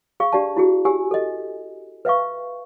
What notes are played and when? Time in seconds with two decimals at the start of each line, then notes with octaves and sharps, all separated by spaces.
0.20 G#4 F5 C#6
0.33 D4 G4 D5 F5 A5
0.56 E4 F#4 G#4
0.85 G4 G#5 E6
1.11 A4 D#5
2.05 B4 E5 F5 C#6